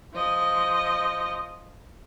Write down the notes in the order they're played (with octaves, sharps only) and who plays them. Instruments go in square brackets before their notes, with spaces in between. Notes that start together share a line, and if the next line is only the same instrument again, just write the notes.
[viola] F3 D#5